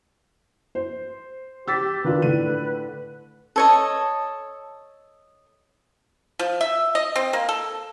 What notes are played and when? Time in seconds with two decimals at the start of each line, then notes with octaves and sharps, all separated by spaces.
0.75 C5
1.68 G4 E6 A6 B6
2.04 D#3 D4 F4 B4
2.22 A2 D3 D#7
3.56 A4 C#5 D#5
6.39 F3
6.61 E5
6.95 D#5
7.16 C4
7.33 A#3
7.49 A4